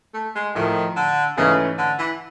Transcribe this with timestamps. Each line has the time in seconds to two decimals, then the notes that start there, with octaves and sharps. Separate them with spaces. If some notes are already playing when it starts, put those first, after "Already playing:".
0.14 A3
0.35 G#3
0.55 A2 D#3 F3 A3
0.96 D3
1.37 G#2 C#3 E3 A3 C#4
1.78 D3
1.99 E3